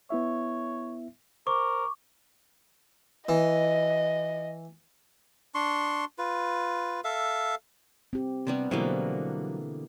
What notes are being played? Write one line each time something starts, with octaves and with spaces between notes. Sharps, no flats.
B3 E4 C#5 E5
A#4 C5 C#6 D6
E3 D#5
D4 C6 C#6
F4 B4
A4 E5 F5
C4 G4
C3 G3 B3 D4
B2 D3 E3 F#3 G3 A#3 C5